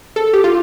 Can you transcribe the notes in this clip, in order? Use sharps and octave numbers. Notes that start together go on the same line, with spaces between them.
A4
G4
F4